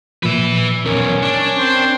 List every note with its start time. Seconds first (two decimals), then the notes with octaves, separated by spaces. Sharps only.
0.23 A#2 F3 B4 E5
0.86 B1 E2 C#4 A#4
1.23 D4
1.59 C4 C5